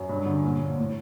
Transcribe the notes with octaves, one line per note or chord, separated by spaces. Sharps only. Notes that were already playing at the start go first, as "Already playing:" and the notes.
Already playing: F#2
G2
D3
A#1
A#2
A2